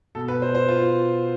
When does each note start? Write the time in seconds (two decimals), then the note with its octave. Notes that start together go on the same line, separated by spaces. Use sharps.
0.15 B2 A4
0.28 B4
0.42 C5
0.55 C5
0.68 F4